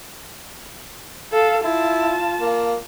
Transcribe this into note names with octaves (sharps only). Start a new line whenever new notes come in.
A4 F5
E4 F4 A5
A#3